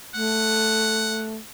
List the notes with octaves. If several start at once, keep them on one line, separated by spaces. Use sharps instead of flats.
A3 F#5